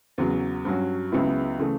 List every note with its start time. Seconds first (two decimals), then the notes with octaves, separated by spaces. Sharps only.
0.18 E2 C#3 F#3
0.65 G2 F#3 C#4 F#4
1.12 C#2 C#3 F#3 B3 E4
1.59 C#3 E3 A3